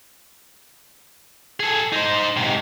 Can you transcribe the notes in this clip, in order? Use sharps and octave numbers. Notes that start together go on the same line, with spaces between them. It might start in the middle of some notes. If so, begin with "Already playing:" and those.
G#4 A4
D#4 C5
G#2 C3